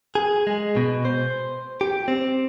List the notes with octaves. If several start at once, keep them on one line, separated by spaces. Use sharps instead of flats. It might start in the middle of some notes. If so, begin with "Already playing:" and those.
G#4
G#3
B2
C5
G4
C4